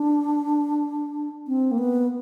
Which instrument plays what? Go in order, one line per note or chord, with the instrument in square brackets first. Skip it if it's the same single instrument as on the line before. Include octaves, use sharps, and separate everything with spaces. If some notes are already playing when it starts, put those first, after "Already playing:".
Already playing: [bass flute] D4
C4
A#3
B3